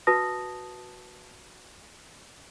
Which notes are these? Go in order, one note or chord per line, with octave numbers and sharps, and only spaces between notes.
F#4 B4 A5 D#6 A#6